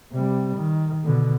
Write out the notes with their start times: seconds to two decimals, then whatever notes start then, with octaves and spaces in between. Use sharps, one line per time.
0.12 C3 G3
0.56 D#3
1.04 B2 D3